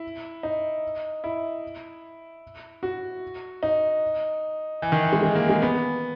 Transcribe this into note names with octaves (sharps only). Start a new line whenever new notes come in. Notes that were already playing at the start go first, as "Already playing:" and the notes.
Already playing: E4
D#4
E4
F#4
D#4
E3
D#3
E3
G#3
G#3
A#3
G#3
B3